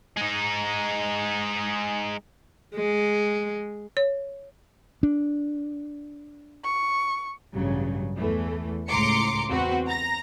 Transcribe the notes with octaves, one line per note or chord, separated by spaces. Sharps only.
G#3 D#4
G#3
C#5
D4
C#6
A1 G2 C#3 F#3
E2 E3 A3
C#2 A2 A#5 C6 D6 C#7
E2 C4 F#4 B4
A#5 A#6